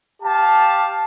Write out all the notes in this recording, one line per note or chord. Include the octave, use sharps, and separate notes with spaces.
G4 F5 A5